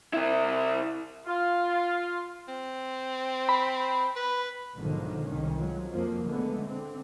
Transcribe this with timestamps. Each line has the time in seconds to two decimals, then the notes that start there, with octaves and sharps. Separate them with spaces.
0.13 C3 E4
1.26 F4
2.48 C4
3.49 B5
4.16 B4
4.78 B1 G#2 D3 D#3 F3
5.26 C2 D#3 C#4
5.58 F3 F#3 G#3
5.92 F2 F3 A#3
6.25 D3 G#3 A3 B3
6.64 D3 C4